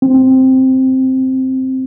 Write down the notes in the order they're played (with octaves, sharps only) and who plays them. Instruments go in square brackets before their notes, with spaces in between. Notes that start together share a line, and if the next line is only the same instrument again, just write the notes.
[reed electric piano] C4